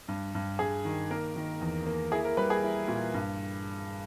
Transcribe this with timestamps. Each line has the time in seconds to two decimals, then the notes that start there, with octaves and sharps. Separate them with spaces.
0.08 G2
0.35 G2
0.59 G2 G#4
0.85 D#3
1.11 A#3 A#4
1.36 D#3
1.61 E2
1.86 A#3
2.12 E4 G#4
2.25 A#4
2.37 G3 B4
2.50 G#4
2.63 E4
2.88 A#2
3.14 G2